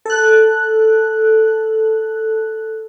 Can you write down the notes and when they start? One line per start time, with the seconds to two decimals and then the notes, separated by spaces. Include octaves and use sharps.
0.05 A4 F#6